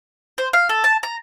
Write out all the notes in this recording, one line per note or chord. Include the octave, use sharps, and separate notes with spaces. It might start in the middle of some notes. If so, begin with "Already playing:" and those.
C5
F5
A4
A5
A#5